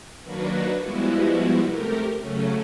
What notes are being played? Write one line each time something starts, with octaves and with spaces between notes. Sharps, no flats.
D#3 F#3 A#3 D4 F#4 B4
F3 G3 G#3 B3 E4 F#4
C3 A3 G4 A#4
C#3 F#3 A3 C#4